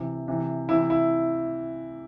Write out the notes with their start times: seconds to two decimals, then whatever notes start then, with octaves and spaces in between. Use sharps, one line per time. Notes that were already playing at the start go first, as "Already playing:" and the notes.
Already playing: C3 E3
0.28 C3 E3
0.69 C3 E3 E4
0.90 E4